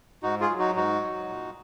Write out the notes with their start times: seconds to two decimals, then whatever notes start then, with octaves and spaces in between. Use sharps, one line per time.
0.23 G#2 D#4 F#4
0.41 F4 G#4
0.50 F#3
0.59 D#4 F#4
0.75 G#2 D#4 F#4
1.02 F#3
1.29 A#2